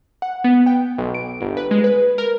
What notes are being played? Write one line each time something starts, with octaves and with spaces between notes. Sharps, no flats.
F#5
B3
G5
B1
D7
G1
B4
G#3
B4
A#4